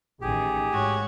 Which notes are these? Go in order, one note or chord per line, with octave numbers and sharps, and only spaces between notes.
A1 D#3 G4 G#4
G#2 F#4 C#5